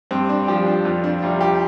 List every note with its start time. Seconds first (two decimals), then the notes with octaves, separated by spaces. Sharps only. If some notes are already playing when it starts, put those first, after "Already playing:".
0.11 G2 C4
0.29 D4
0.48 F3 G4
0.66 D4
0.85 F2 F4
1.04 D4
1.22 C3 G3 F4
1.41 G4